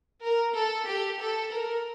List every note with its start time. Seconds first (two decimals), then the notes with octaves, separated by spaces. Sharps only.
0.23 A#4
0.55 A4
0.87 G4
1.21 A4
1.53 A#4